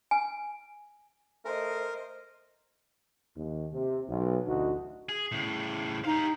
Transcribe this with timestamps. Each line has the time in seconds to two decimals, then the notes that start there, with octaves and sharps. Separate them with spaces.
0.11 G#5
1.45 A3 A#4 C5 D#5
3.36 D#2
3.73 C3
4.08 B1
4.47 A1 D2 D#4 F#4
5.09 G#4
5.32 A2 C#3
6.05 D#4 G4 F5